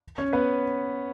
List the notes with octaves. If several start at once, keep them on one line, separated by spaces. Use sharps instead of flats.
C#4 C#5
B3 B4